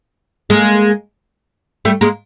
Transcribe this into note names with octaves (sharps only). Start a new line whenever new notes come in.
G#3 A#3
G3 A3
G#3 A#3